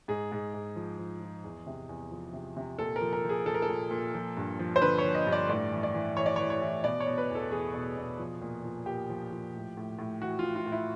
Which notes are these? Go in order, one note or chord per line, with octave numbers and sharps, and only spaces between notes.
G#2 G#4
G#2
G#2
F3
F3
F3
E2
C3
E2
F3
C3
C3
A#2 A4
A#4
F3
A#4
F3
G#4
F3 A4
A#4
A4
A#2
A#2
F3
G2
F3
C5
D3 B4
F3 C#5
D#5
G2
D5
A2 D5
E3
D5
E3
E3 C#5
D5
E3 C#5
C#5
E3
B2 D5
C#5
B2
B4
E2
A4
E2 G#4
B2
B2
F3
A#2
F3
A#2 G4
F3
F3
A2
A2
A2
E3 F#4
F4
A2
F4
A2
E4